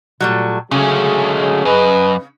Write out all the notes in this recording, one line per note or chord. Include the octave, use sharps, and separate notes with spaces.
A#2 F#3 G3 A3
D2 C#3 F#3 G#3 A3 C#4 G#4
F#2 B4 D#5